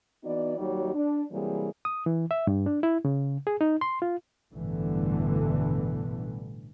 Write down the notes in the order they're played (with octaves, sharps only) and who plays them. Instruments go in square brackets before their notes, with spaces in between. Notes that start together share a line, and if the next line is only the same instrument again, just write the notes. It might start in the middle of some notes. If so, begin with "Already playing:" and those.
[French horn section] E3 B3 D#4 F#4 D5
D#2 F#3 G3 D#4 F#4 C#5
D4
C3 E3 F#3 G3 A#3 G#4
[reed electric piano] D#6
E3
E5
G2
D4
E4
C#3
G#4
D#4
C6
F4
[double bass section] A1 G2 B2 D3 E3 A3